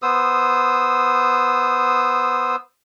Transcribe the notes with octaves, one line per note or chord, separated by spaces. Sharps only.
B3 C5 D#6 E6